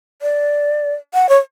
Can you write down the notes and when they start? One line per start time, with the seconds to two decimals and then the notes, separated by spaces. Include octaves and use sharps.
0.22 D5
1.14 F#5
1.29 C#5